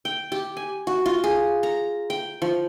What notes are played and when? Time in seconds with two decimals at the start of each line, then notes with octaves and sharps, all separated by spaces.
0.05 G5
0.32 G4
0.57 G#5
0.87 F#4
1.06 F4
1.24 G#4
1.63 A#5
2.10 G5
2.42 F3